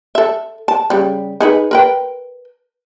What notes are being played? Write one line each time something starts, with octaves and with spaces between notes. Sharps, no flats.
A4 E5
A5
C#3 G3
D#4 G#4 B4
A#4 B4 G5